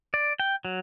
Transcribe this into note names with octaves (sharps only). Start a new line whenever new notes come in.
D5
G5
F#3